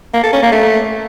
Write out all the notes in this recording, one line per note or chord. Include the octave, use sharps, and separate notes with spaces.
A#3
A4
C#4
A#3
A3